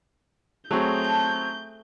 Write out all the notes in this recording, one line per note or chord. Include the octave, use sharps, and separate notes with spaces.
F#3 A3 C4 G#4 G6
A5